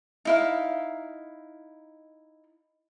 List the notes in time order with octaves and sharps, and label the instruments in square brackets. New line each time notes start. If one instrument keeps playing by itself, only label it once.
[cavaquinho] D#4 E4 F5